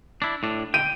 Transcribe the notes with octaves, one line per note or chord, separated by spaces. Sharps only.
D4 E4
A2 D4
G5 D#7